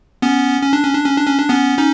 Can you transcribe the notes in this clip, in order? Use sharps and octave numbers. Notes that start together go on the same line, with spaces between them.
B3 C#4
C#4
D4
C#4
D4
C#4
D4
C#4
D4
B3 C#4
C#4 D#4